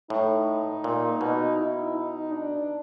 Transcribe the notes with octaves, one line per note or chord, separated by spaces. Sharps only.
A2 D#4
A#2
B2
E4
D#4
D4